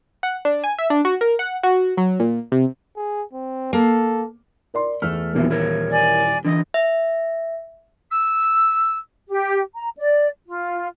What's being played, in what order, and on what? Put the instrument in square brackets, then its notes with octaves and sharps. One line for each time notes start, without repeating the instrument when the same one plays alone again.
[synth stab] F#5
D4
G#5
E5
D4
F#4
A#4
F#5
F#4
F#3
A#2
C3
[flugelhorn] G#4
C4
[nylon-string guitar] A#3 [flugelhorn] A4
[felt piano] A#4 D5 C6
[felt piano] E2 F6 [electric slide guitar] A3
[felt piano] D#1 E3 E5 [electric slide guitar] F2 B2 A#3
[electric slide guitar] E4 A#4 C#5
[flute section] D5 G#5
[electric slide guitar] D3 E3 [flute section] D#5
[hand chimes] E5
[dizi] E6
[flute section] G4
A#5
D5
F4